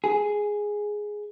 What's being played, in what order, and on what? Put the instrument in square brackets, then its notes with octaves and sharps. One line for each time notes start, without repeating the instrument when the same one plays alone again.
[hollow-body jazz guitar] G#4